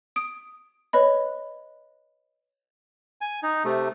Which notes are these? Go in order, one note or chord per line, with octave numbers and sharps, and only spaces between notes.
D#6 D7
B4 C#5 D#5 B5
G#5
D#4
C3 A3